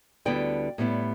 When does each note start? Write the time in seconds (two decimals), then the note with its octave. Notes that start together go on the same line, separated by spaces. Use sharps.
0.25 D2 D3 G3 B3 E4 D5 G5
0.78 A2 G3 B3 E4